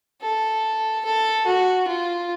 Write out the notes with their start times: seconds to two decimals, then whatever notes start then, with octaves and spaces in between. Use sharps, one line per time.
0.22 A4
1.05 A4
1.46 F#4
1.87 F4